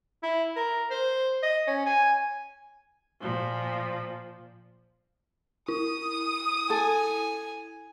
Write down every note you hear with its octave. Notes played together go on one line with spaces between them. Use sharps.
E4
A#4
C5
D#5
C#4
G#5
A#2 F3
E4 D#6
A4 G#5